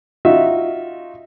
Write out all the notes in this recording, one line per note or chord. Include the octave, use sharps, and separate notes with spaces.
D#4 F4 F#4 E5